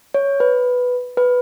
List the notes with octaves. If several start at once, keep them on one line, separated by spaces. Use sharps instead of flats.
C#5
B4
B4